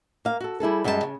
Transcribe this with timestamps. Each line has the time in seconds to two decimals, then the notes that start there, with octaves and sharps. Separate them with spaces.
0.25 A#3 F5
0.40 F#4 A4
0.60 G3 E4 G#4 A4
0.84 F#2 G3 G#3 D#4 A4 A5
1.03 C#3